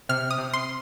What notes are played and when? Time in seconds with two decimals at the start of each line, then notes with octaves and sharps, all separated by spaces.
0.09 C3 F6
0.31 D#6
0.38 C3
0.53 C6